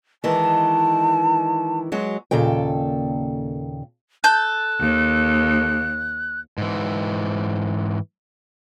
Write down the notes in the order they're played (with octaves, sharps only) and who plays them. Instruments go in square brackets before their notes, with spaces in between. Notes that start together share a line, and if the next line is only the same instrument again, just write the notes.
[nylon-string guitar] D#3 E3 G#3 [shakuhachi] A5
[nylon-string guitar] F#3 G#3 F#4
[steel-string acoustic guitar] D#2 A#2 C#3 A4 G5
[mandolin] A4 G6 [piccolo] F#6
[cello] D#2
[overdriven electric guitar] G#2 E3